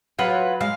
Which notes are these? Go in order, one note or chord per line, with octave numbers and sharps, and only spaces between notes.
F#3 F4 B4 F#5
G#3 F5